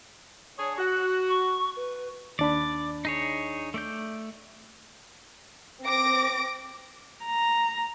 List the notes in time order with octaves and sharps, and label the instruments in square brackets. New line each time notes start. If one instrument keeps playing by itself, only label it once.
[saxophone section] D4 G#4 C#5 [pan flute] D#6
[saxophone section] F#4 [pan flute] F#6
[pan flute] C#6
B4
[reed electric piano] D#2 D4 B5 [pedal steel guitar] D5
[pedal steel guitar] D#4 G#4 C#5
A3 D5 G6
[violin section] C4 D6 A#6 D7
[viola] A#5